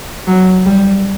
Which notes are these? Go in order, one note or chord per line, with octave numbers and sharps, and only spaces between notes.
F#3
G3